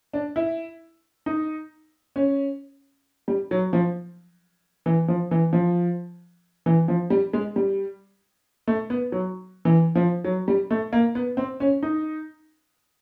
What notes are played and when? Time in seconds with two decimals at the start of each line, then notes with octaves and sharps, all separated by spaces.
0.13 D4
0.36 E4
1.26 D#4
2.16 C#4
3.28 G3
3.51 F#3
3.73 F3
4.86 E3
5.08 F3
5.31 E3
5.53 F3
6.66 E3
6.88 F3
7.10 G3
7.33 G#3
7.56 G3
8.68 A3
8.90 B3
9.12 F#3
9.65 E3
9.95 F3
10.24 F#3
10.48 G3
10.71 A3
10.93 A#3
11.15 B3
11.37 C4
11.60 C#4
11.83 D#4